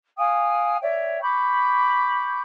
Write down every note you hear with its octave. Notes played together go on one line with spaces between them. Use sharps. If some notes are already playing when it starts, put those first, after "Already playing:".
F5 G5 G#5 D#6
C#5 D5 E5 G5
B5 C#6 D6 G6